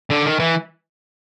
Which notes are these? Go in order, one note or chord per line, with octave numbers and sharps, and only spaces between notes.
D3
D#3
E3